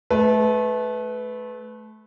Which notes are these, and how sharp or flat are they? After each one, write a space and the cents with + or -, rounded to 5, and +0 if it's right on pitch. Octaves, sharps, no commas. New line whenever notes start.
A3 -25 B4 +10